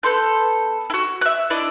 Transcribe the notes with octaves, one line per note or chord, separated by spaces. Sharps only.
B3 A4 C6 G6
E4 F#4
E5 F#6
D4 E4 D5 D#5